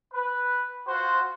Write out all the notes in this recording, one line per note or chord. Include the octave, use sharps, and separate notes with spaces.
B4
F4 F#4 C5